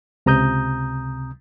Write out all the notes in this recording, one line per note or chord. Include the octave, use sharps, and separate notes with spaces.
C#2 C3 A#5 D#6 G6